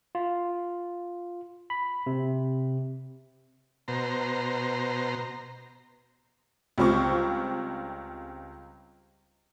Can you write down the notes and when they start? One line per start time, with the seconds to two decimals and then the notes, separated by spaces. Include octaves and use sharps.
0.15 F4
1.70 B5
2.06 C3
3.88 B2 C5 A#5
6.78 C#2 G3 C4 F4 C#6